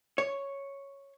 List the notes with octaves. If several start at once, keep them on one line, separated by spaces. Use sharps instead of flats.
C#5